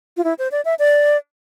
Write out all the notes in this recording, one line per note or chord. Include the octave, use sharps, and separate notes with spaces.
F4
E4
C5
D5
E5
D5